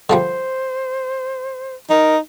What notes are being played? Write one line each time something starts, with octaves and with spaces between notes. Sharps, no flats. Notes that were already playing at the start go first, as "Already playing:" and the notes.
D3 F3 G3 C5
D#4 A#4